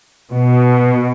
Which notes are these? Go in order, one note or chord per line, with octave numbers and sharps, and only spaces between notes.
B2